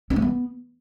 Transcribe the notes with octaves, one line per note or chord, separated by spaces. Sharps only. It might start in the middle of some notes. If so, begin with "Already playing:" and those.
C#4
A3
B3